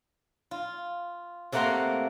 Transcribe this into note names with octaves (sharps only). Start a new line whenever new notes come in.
F4
C3 A3 A#3 F#5 A#5 C6